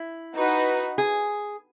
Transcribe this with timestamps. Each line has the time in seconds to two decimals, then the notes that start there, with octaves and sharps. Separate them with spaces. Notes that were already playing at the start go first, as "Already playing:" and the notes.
Already playing: E4
0.35 D#4 F#4 B4
0.98 G#4